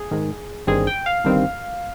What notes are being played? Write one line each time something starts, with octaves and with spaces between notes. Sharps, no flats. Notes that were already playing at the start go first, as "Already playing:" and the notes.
Already playing: G#4
G#2 D#3 G#3
G1 G2 D#3 G3 C4 G#4
G5
F5
G1 G2 D#3 G3 C4